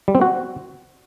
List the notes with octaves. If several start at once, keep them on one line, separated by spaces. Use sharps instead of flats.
G3
C4
F#4